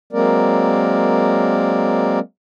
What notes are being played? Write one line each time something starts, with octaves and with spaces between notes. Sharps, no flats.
F#3 G#3 A#3 C4 A#4 D5